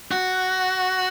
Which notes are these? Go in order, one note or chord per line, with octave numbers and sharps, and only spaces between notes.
F#4